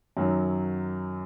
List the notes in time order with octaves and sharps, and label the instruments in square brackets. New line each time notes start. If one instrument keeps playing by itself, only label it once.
[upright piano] F#2 D#3 F#3